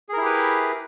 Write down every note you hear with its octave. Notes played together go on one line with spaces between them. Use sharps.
E4 G4 G#4 A#4 B4